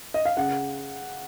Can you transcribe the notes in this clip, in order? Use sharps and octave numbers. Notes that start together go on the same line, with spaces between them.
D#5
F5
C#3 F#5